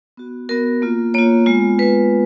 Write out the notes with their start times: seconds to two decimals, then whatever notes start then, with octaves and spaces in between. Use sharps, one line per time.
0.17 B3 F#4
0.49 B3 F#4 A#4
0.82 A#3 F4
1.14 A#3 F4 C#5
1.46 G#3 B3 F4
1.79 G#3 B3 F4 B4